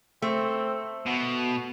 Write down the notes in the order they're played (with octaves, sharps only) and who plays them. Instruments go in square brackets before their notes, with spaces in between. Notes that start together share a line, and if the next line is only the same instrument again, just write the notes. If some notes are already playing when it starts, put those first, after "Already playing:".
[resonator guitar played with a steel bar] A3 [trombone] C4
[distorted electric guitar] B2 [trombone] F#4